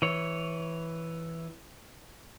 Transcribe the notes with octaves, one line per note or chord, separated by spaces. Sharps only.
E3 C#5